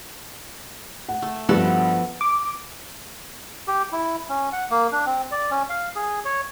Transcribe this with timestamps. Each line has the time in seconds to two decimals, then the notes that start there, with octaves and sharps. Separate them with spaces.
1.09 F#5
1.22 A3
1.49 G2 F3 B3 F#4 A4
2.21 D6
3.68 G4
3.92 E4
4.29 C#4
4.53 F#5
4.70 A#3
4.92 D4
5.06 C4
5.31 D5
5.51 C#4
5.69 F5
5.95 G#4
6.25 C#5